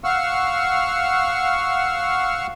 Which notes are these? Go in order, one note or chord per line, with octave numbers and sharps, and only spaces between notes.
F5 F#5 C#6 E6 F6